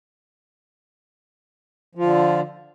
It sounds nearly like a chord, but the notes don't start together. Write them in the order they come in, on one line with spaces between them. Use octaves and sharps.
F3 F4 D3